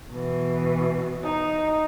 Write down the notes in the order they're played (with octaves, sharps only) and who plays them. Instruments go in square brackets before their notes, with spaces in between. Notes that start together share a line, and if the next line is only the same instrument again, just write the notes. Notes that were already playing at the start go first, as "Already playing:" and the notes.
[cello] B2 E3
[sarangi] D#4